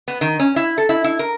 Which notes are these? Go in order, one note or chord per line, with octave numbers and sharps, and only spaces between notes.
B3
D#3
C#4
E4
A4
E4
E4
A#4